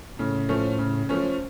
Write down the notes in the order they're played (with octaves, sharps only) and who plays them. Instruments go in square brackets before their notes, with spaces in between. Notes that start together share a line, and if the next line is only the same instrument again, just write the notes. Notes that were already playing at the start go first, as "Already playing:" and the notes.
[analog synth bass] A2 [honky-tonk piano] C#3
[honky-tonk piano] F3 A3 C#4
C#3
F3 A3 C#4